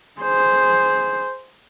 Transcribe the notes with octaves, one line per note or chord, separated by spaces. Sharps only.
G#4 C5